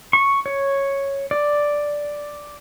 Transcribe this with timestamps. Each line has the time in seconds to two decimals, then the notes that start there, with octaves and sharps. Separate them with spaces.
0.13 C#6
0.46 C#5
1.31 D5